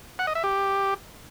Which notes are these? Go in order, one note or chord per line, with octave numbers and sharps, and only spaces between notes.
F#5
D#5
E5
G4